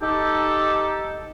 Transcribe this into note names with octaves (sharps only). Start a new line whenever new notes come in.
D#4 G4 A4